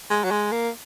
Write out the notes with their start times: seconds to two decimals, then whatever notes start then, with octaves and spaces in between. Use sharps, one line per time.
0.10 G#3
0.24 F#3
0.31 G#3
0.52 A#3